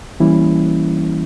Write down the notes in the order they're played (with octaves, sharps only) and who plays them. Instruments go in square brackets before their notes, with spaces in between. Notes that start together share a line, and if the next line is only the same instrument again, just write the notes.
[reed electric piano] E3 G3 A#3 C#4 E4